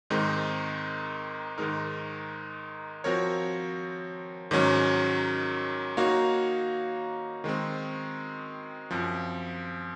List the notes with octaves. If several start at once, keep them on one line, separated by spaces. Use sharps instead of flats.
G#2 D#3 G#3 C4 D#4
G#2 D#3 G#3 D#4 A#4
F3 C4 F#4 A#4 C#5
G#2 D#3 F#3 C#4
A#3 D#4 F#4 C#5 F5
D#3 G#3 C4
F#2 F3 C4